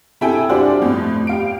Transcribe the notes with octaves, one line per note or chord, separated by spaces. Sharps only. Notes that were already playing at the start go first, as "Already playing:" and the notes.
C3 E4 A4 E5 G5 G#5
G3 D4 F4 F#4 C5 D5
F2 A2
G4 F5 D7